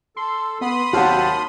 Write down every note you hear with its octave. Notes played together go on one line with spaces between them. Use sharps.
A4 C6
B3 B5 C6 D#6
D#2 C3 F#3 F#4 F#5 A5